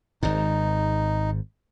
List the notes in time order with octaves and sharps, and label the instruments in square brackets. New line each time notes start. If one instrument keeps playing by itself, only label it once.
[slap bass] G#1 G#2 [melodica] D#4